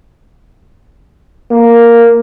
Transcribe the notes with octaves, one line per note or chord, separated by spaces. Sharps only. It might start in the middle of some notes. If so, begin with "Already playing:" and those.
A#3